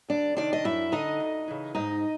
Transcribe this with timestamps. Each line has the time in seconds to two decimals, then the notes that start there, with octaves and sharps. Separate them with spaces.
0.09 D2 D4 D5
0.37 C3 D#3 D4 D5
0.53 D#5
0.64 F#2 E4 E5
0.92 D3 D#4 D#5
1.20 D2
1.48 C#3 E3
1.75 G#2 D#4 D#5